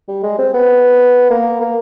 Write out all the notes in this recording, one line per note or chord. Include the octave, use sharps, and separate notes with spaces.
G3
G#3
C4
B3
A#3
A#3